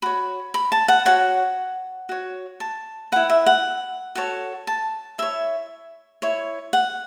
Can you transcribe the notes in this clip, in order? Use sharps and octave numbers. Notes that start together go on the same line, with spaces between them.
F#4 C#5 B5
B5
A5
F#5
F#4 C#5 F#5
F#4 C#5
A5
E4 B4 F#5
E5
F#5
F#4 A4 C#5
A5
E4 C#5 E5
E4 C#5
F#5